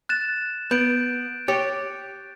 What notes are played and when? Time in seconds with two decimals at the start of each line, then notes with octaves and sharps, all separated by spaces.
0.09 F#6 A6 E7
0.71 B3 G6 D7
1.48 G4 C#5 A6